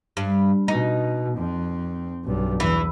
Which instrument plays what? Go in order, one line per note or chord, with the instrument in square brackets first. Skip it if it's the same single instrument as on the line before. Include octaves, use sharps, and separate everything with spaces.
[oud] G2
[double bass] B2 [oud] D#4
[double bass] F2 C4
B1 G2
[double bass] E2 [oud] E3